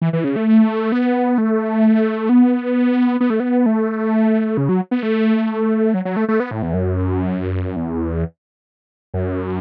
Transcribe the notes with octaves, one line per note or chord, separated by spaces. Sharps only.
E3
E3
C#3
A3
B3
A3
B3
B3
A3
B3
A3
C#3
F#3
B3
A3
F#3
F#3
A3
A3
B3
A2
E2
F#2
E2
F#2